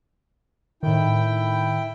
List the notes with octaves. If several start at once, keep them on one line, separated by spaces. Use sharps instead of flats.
A2 D#3 E4 G5